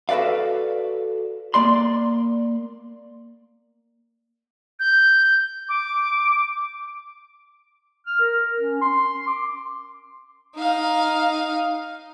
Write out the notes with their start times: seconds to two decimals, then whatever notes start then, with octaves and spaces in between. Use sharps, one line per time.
0.09 F#4 A4 B4 D5 F5
1.54 A#3 D5 C6
4.80 G6
5.69 D6
8.06 F6
8.20 A#4
8.60 C#4
8.82 C6
9.27 D6
10.56 D#4 F5